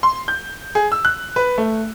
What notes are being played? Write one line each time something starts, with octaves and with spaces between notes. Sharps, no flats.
C6
G6
G#4
E6
F#6
B4
A3